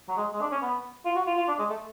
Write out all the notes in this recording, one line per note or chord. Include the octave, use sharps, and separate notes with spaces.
F#3
G#3
G#3
D4
C#4
B3
F4
F#4
F4
F4
D4
G#3
A3